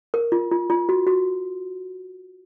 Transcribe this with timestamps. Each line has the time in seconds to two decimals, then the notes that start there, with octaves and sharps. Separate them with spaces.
0.14 A#4
0.32 F4
0.52 F4
0.70 F4
0.89 F#4
1.07 F#4